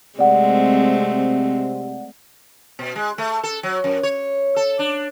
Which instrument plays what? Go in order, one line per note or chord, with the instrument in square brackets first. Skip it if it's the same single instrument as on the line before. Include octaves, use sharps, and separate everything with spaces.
[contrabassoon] C3 [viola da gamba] G#3 A3 C4 [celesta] D5 F#5
[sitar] B2
G#3
A3
A4
F#3
F#2
C#5
A4
D4